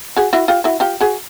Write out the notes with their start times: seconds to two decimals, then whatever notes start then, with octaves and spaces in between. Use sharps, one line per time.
0.16 F#4 G#4
0.33 E4 F#4
0.48 F4 G4
0.64 E4 F#4
0.80 F4 G4
1.01 F#4 G#4